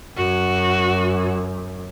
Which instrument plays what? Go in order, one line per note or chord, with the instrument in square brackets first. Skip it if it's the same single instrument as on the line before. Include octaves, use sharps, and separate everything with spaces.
[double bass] F#2 [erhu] F#4